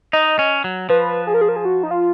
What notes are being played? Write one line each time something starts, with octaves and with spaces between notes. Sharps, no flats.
D#4 D#5
C#4
F#3
F3 B4
G#4
A#4
G#4
A#4
G#4
F#4
D#4
F4